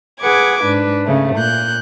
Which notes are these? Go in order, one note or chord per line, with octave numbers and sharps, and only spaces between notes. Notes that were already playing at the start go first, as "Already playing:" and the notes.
G#4 B4 F#5 D6 G#6
G#2 D4 B4
C#3 A3
A#2 F#6 G6